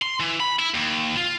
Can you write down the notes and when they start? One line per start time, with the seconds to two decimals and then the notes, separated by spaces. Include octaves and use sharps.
0.02 C6
0.20 E3
0.40 B5
0.59 E4
0.75 D#2
1.17 F4